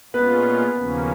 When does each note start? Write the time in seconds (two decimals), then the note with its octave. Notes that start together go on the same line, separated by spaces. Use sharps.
0.14 A#2 G#3 B3 C#4 F4 B4
0.76 D#2 C#3 F3 A#3 C#4